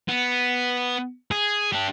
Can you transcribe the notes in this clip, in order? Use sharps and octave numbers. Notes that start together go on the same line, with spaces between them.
B3
G#4
D4 G4